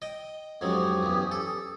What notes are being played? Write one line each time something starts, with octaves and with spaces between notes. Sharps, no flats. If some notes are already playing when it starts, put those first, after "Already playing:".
D#5 G5
F2 G#2 F#3 C#4 G4 D#6
E2 G2
A4